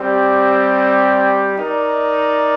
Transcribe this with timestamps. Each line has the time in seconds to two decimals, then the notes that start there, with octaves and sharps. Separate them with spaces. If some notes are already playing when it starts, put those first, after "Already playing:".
Already playing: G3 C4 G4 D5
1.56 D#4 A#4 D5